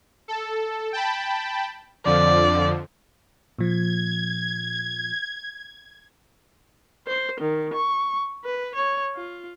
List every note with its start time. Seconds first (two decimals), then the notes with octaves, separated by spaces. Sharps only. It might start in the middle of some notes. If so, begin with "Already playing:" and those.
0.28 A4
0.93 G5 A5 B5
2.05 F2 D3 F3 D5
3.59 A#2 F3 G#6
7.07 C5
7.40 D#3
7.74 C#6
8.45 B4
8.75 C#5
9.16 F4